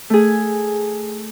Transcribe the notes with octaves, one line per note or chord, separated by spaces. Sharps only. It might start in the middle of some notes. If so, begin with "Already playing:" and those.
A3 G#4